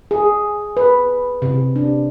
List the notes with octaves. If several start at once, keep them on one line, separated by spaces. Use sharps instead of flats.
G#4
B4
C3
D4